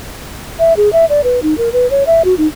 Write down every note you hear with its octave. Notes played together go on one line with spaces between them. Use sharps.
E5
G#4
E5
D5
B4
D#4
A#4
B4
C#5
E5
F#4
D#4